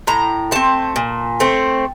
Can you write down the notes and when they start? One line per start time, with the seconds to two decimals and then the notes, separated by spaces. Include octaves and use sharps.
0.07 A2 A#5
0.51 A3 C4 A5
0.96 A#2
1.40 A3 C4